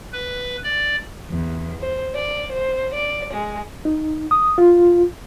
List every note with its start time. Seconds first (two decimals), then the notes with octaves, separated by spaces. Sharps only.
0.13 B4
0.64 D5
1.28 E2
1.79 C5
2.15 D5
2.52 C5
2.93 D5
3.32 G#3
3.85 D#4
4.31 D#6
4.58 F4